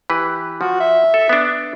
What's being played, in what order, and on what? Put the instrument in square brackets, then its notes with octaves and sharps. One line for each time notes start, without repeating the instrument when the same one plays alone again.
[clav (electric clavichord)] E3 G4 B4
[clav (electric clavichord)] F3 [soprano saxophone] F#4
[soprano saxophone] E5
[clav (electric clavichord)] A4
B3 D4